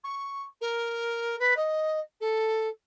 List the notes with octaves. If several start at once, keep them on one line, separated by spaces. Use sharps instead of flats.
C#6
A#4
B4
D#5
A4